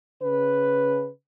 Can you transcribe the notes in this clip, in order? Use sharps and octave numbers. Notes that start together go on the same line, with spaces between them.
C#3 B4